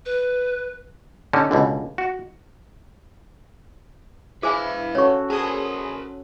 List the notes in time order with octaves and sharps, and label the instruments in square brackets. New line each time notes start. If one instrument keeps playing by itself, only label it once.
[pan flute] B4
[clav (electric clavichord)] D3 C#4 D#4 G4
C#2 B2 D3
F#4
[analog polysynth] E4 [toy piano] G#4 C5 G#5 [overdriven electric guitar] B4 F5
[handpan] C#4 F#4 A4 [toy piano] C#5 C#6
[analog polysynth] G#4 D#6 [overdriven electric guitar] A#4 C5 [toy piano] A5